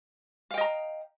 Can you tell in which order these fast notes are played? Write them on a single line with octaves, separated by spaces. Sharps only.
F5 G5 D#5 A#5